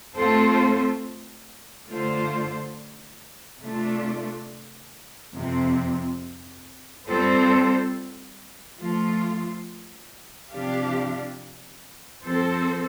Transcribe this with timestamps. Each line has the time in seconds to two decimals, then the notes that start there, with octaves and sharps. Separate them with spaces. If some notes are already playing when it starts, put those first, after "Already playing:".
0.16 A3 C4 F4 A4 C5
1.89 D3 A3 F4 C5
3.62 C3 A3 D4 F4
5.35 F2 C3 F3 C4
7.07 G3 C4 F4 A4 C5
8.80 F3 A3 F4
10.53 C3 F3 D4 G4 F5
12.25 F3 C4 A4 C5